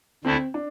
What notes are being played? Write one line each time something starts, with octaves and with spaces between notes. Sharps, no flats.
D2 D3 A3 C4 E4
D4